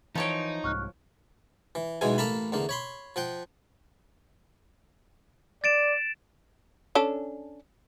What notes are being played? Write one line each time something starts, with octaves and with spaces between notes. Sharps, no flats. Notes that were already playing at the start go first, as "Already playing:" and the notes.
E3 F3 D#4 C#5 G5
C2 G#2 C#6 F6 F#6
E3
B1 B2 E3 G#3 G#5
A1 A#3 A4 F5 A5 B5
E2 D3 A#3
C#5 B5 C6
F3 F#5 G5
D5 A6 D7 E7
C#4 D4 A4